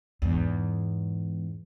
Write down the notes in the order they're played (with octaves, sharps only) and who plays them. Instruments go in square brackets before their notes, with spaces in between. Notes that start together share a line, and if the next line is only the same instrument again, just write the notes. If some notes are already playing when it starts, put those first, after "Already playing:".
[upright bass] E2 G#2